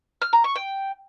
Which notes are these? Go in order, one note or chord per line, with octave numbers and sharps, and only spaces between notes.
F6
A#5
C#6
G5